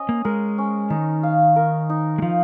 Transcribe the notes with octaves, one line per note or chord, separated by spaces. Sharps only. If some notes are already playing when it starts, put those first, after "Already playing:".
Already playing: C#4 D#5
A#3
G#3 A#4
C#4
D#3 D#4
F5
A#4
D#4
G#3
F3 F5